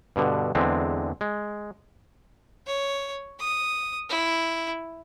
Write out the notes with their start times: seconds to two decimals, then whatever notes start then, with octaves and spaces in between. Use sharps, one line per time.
0.16 G2 B2 D3
0.55 E2 D3 G#3 C4
1.21 G#3
2.66 C#5
3.39 D#6
4.09 E4